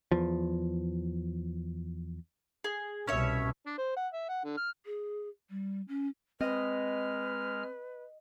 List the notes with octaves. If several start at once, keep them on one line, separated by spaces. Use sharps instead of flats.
E2 F3
G#4
C2 B2 C#4 C#5 E5
D4
C5
F#5
E5
F#5
D3
F6
G#4
G3
C#4
G#3 C4 B4 D#5 F6